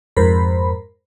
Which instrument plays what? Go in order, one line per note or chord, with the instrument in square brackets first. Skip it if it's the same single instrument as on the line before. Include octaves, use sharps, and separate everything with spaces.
[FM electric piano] F2 G#2 A#4 C5 B5